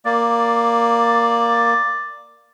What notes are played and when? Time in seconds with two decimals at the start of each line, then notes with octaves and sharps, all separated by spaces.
0.05 A#3 D5